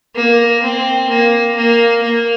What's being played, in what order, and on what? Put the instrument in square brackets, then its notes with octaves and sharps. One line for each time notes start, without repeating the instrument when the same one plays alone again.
[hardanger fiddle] A#3
C4
A#3
A#3
A#3